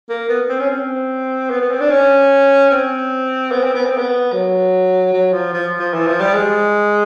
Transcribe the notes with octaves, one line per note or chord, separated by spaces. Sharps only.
A#3
B3
C4
C#4
C4
B3
B3
C4
D4
C#4
C4
B3
C4
B3
C4
B3
F#3
F#3
F3
F3
F3
E3
F3
G3
G#3